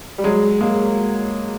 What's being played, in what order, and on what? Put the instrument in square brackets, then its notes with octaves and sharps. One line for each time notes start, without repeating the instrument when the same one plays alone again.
[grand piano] G3
F#3 G#3
G#3 A#3